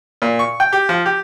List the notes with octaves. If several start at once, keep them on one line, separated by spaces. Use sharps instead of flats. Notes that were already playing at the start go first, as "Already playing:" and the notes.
A#2
C#6
G5
G4
F3
G4